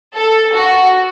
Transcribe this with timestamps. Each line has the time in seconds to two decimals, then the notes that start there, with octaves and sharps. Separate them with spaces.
0.16 A4
0.53 F#4